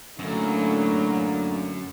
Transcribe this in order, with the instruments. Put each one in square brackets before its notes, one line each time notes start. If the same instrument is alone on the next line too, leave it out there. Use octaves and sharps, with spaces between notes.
[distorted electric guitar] F#2 [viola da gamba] A2 F#3 [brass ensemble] D3 A#3